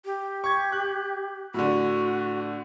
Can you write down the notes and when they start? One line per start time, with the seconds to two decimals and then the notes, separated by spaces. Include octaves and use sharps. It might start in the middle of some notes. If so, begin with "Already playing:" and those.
0.05 G4
0.44 C#6 G#6
0.72 F#6
1.54 A2 D3 F#4